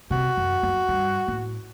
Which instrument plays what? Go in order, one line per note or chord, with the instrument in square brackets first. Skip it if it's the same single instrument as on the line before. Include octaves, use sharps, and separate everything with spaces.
[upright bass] C3 [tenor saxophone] F#4
[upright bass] F#2
F#2
G2
A2